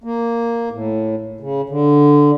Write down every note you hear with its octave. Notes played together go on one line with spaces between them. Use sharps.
A#3
A2
C#3
D3